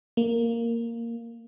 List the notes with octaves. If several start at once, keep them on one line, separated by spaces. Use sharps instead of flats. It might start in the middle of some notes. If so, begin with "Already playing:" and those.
A#3